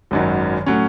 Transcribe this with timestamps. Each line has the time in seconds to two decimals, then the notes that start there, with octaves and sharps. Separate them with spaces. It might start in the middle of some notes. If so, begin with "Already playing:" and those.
0.11 G#1 F#2 D#3 F#3
0.66 A2 F#3 C#4